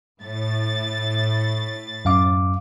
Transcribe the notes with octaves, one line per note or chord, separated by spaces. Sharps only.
A2 A6
F#2 F5 D6